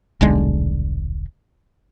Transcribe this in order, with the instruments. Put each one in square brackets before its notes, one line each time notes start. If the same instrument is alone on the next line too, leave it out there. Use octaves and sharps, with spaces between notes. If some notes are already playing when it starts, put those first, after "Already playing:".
[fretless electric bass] D#1 B1 D3 G#3